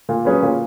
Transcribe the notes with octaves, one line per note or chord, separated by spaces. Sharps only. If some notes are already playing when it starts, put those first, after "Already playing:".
A#2
F#3 C#4 G#4 B4
A#2